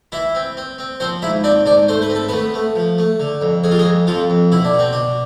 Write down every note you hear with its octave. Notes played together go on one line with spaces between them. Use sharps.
E3 E4 E5
C4
C4
C4
F3 C4 C5
G#2 E4 E5
C4 D4 D5
G#2 D4 D5
A3 C5
B4
C4
A4
A3 B3 B4
A3
F3
A3
D3
F2
F2 G#4
F4
G#3 G#4
F2
F2 F3 F4
F2
B2 E4
D4
B2
C4
B2 D4